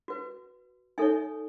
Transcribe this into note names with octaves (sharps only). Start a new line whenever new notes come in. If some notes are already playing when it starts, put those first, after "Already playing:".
F#4 B4
D#4 A4 C#5 E5 G#5